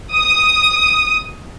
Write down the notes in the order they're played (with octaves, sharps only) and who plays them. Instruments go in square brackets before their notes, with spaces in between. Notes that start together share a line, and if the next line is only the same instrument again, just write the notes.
[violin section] D#6